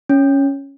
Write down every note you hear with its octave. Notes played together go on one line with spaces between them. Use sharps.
C#4